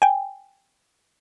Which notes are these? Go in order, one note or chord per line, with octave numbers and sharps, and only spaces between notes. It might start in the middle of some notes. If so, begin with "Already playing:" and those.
G5 G#5